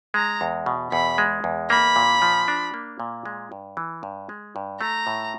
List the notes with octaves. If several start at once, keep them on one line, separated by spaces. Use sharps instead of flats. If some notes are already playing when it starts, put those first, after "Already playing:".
G#3 A#5
E2
B2
E2 B5
G#3
E2
A#3 B5
A#2
F3
D4
A#3
A#2
G#3
G2
E3
G2
G#3
G2
A3 A#5
A2